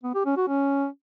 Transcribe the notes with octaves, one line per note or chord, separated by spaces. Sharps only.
B3
G4
C#4
F#4
C#4